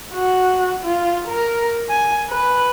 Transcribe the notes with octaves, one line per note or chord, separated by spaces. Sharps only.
F#4
F4
A#4
G#5
B4